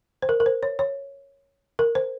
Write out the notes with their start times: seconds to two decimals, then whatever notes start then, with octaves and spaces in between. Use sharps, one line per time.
0.22 C5
0.29 A#4
0.40 A#4
0.46 C5
0.63 C#5
0.79 C#5
1.79 A#4
1.95 C5